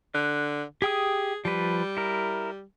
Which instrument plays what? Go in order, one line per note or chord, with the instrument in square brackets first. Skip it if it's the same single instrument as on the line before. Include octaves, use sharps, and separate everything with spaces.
[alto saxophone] D3 [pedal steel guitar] F#6
[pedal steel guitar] G4 G5 D#6 [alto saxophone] G#4
[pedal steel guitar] F3 B4 [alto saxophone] G3
[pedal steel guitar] E4 A#4